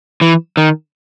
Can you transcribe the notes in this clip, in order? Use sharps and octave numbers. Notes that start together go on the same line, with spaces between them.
E3
D#3